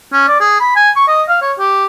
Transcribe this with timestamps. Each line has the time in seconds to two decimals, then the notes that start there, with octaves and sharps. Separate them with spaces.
0.12 C#4
0.28 D5
0.40 G#4
0.60 B5
0.76 G#5
0.96 C#6
1.08 D#5
1.29 F5
1.42 C#5
1.59 G4